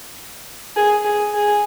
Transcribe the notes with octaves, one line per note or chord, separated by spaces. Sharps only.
G#4
G#4
G#4